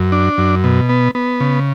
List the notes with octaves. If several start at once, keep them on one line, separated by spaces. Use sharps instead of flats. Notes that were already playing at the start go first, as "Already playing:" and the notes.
Already playing: F#2
D4
F#2
B2
B3
B3
C#3